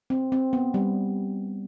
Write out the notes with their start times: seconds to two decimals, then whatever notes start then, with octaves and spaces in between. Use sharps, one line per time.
0.10 C4
0.32 C4
0.53 B3
0.74 G3